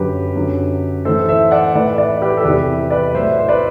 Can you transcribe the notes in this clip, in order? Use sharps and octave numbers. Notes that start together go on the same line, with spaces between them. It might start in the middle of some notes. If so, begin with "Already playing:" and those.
Already playing: F#2 D3 F#3 G4 B4
F#2 D3 F#3
A2 E3 A4 C5
C5 E5
D5 F#5
A2 E3 B4 D5
B4 D5
G4 B4
A4
E2 C3 E3 G4 B4
B4 D5
A2 F#3 C5 E5
C5
B4 D5